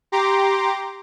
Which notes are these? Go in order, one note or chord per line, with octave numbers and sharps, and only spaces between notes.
G4 A#5 C6 D6